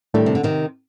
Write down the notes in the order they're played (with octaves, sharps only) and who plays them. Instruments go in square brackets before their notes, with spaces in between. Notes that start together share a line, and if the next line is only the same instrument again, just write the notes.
[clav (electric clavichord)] A2 A3 D4 [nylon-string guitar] D#3 G3
[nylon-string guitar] C3
D3
C3 D#3